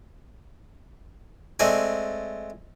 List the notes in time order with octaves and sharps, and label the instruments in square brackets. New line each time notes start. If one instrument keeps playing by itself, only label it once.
[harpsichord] G#3 A3 C4 D5 G#5